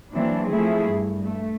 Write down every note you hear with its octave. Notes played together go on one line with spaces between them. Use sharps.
E3 F#3 A#3 C4 D4 E4
F3 A3 E4 G#4
G2
A3